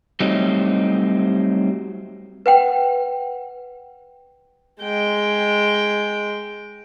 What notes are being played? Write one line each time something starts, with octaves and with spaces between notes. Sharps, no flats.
F#3 G3 A3 C4 D#4
B4 F#5 G5
G#3 G5